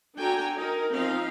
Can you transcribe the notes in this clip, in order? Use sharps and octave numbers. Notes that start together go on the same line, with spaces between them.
D4 F#4 A4 G5 G#5 A#5
D#4 A#4
F3 C4 D#4 F5